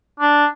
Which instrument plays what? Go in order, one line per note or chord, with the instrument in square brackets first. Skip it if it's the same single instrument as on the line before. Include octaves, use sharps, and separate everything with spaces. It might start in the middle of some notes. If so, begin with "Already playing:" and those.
[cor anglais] D4